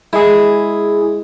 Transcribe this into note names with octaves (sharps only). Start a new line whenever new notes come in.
G#3 E4 G#4